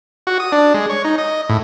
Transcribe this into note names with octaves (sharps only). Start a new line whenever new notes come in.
F#4
D#6
D4
G#3
C#5
D#4
D#5
A2